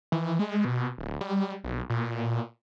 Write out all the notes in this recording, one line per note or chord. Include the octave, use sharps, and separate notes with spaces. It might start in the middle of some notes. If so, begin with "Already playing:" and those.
E3
G#3
B2
D1
G3
B1
A#2